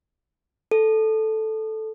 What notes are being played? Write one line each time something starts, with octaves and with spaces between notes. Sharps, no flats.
A4